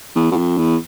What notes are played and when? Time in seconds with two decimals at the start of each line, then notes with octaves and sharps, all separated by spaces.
0.15 E2
0.31 F#2
0.37 F2
0.57 E2